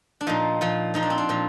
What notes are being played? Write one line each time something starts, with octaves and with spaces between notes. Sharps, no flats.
D4
A#2 F3 D#4
A#2 F3
A#2 F3 D#4
D4
C4
D4
A#2 F3